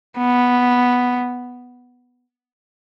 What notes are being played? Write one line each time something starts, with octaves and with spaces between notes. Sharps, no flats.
B3